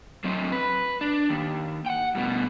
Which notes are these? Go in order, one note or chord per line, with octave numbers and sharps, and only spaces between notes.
F#3 C4
B4
D4
D#2
F#5 G5
G2 B2